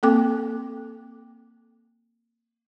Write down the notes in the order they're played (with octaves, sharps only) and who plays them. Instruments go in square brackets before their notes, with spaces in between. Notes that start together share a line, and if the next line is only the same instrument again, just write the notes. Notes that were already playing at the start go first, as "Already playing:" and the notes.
[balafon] A#3 C4 A4 G5 D6